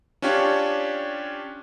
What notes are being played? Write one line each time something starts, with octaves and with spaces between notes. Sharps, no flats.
C#4 D4 F4 G4 C#5